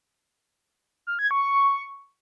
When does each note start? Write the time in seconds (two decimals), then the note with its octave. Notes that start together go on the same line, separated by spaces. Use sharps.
1.07 F6
1.19 G#6
1.31 C#6